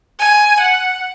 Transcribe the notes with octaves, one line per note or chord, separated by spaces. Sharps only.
G#5
F#5